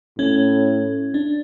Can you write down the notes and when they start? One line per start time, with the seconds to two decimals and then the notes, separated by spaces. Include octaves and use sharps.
0.18 A2 C#4
1.14 D4